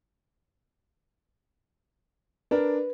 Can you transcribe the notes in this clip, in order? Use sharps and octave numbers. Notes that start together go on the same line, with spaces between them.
D4 A#4 B4